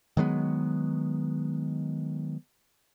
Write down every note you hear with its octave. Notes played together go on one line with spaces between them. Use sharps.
D#3 F#3 G#3 B3